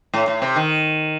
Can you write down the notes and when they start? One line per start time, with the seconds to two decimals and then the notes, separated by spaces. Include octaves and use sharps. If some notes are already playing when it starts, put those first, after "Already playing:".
0.14 A2
0.28 A2
0.42 C3
0.56 D#3